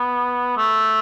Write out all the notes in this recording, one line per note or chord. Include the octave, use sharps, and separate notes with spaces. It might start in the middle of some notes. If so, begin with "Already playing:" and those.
Already playing: B3
A3